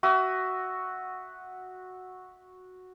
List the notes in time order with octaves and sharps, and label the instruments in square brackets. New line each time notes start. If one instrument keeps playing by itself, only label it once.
[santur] F#4 E5 D#6